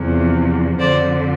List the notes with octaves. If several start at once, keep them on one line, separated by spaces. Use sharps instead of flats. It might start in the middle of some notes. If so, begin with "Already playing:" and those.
Already playing: E2 C3 F3
F2 D3 F3 C5 D5